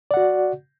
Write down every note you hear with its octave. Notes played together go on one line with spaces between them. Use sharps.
F#4 D5 F#5